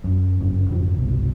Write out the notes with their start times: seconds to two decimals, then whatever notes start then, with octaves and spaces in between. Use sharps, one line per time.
0.04 F#2
0.40 G1 F#2 C#3
0.70 F2 G#2 D3 F3
0.97 G1 C2 G2 B2